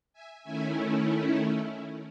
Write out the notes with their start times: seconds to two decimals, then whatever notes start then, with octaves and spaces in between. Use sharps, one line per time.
0.13 E5 G#5
0.43 D#3 A3 C#4 E4 E5 G#5